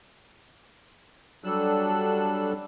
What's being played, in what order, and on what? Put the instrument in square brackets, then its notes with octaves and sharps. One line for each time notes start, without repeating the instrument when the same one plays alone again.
[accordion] F#3 G3 D4 A4 E6 F#6